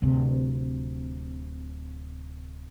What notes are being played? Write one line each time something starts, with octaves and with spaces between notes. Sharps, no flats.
D1 C3